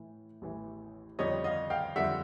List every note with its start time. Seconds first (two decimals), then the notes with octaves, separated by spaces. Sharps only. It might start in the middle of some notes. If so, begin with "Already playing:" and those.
Already playing: A2 E3
0.42 A1 A2 E3
1.19 F2 D3 G3 C#5 D#5
1.44 D#5 F5
1.70 F5 G5
1.96 F2 D3 G3 E5 F#5